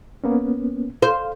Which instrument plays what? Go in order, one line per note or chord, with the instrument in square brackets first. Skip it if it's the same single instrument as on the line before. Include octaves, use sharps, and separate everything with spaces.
[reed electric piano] A#3 B3 C#4
[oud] C5 [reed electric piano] F5